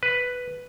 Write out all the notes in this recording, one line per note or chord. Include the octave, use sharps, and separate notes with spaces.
B4